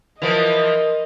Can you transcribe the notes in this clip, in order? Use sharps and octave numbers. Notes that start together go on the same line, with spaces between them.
E3 F3 A#4 D#5